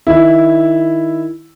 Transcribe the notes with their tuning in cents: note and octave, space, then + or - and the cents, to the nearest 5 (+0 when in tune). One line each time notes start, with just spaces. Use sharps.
D#3 +0 E4 +0